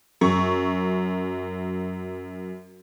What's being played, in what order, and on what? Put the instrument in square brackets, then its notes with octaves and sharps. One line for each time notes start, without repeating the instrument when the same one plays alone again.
[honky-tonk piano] F#2 C#6